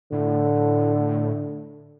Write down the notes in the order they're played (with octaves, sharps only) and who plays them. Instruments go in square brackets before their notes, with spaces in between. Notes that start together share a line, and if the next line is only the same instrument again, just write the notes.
[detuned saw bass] A2 [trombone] D3